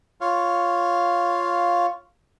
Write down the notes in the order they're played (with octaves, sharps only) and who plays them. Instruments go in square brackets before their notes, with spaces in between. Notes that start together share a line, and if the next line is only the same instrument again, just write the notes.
[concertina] F4 C#5 F5